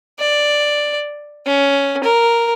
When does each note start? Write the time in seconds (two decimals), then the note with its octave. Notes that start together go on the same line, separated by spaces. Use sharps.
0.19 D5
1.46 C#4
2.03 A#4